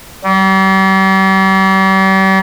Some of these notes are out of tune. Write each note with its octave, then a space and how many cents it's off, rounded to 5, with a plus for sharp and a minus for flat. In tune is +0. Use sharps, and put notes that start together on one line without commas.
G3 -40